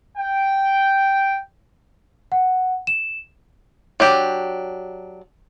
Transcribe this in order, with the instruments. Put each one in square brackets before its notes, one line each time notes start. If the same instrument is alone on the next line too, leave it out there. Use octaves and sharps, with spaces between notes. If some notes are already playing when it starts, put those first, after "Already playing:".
[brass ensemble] G5
[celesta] F#5
E7
[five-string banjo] F#3 D4 G4